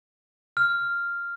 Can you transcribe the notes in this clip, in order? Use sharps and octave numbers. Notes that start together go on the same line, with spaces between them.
F6